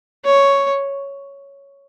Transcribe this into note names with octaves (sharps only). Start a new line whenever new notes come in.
C#5